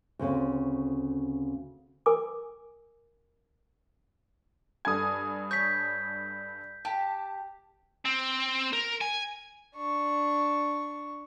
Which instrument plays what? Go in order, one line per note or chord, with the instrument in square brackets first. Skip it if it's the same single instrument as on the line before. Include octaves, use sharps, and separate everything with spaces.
[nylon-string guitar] D2 C#3 C4
[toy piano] A#4 G#5 D6
[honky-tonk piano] G2 A4 G#5 [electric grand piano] D#6 G#6
[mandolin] C#5 [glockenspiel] G6 B6
[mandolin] G4 [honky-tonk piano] A5
[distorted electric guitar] C4
A#4
G#5
[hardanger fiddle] D4 C#6